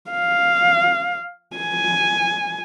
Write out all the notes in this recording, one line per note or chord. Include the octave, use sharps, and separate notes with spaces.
F5
G#5